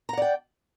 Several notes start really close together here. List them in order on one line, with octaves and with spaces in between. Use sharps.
A#5 F#5 D5 G5